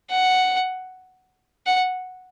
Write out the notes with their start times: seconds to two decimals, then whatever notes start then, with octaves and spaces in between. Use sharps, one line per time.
0.11 F#5
1.66 F#5